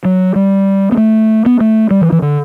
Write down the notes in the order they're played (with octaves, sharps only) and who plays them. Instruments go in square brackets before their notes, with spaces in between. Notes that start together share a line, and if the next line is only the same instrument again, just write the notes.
[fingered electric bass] F#3
G3
B3
A3
B3
A3
G3
E3
E3
D3